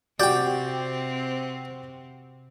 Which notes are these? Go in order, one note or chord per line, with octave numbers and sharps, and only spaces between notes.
C3 C4 F#4 G4 D5 G5 G6